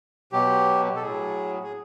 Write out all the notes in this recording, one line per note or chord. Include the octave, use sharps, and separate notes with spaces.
B2 F#3 G4
A4
A2 F#3 G#4
G#4